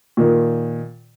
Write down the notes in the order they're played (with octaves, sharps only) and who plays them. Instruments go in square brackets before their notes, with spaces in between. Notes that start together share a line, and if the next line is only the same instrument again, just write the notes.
[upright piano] A#2 D#3